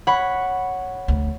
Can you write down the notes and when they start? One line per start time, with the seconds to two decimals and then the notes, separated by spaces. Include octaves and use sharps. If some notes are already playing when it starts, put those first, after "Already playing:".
0.07 C#5 F#5 B5
1.08 D2